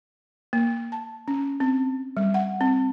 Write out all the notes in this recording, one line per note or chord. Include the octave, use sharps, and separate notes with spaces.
A#3
A5
C#4
C4
G3
F#5
C4